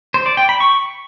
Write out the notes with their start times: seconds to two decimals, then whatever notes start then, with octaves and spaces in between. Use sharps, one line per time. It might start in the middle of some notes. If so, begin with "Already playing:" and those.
0.14 C5
0.26 D5
0.37 G5
0.49 B5
0.60 C#6